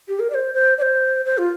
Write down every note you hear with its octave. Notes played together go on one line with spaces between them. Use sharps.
G4
A#4
D5
C5
C5
D5
C5
C5
F4